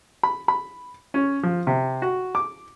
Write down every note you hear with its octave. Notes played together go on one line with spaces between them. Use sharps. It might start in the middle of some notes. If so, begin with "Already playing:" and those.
B5
B5
C#4
F3
C3
F#4
D6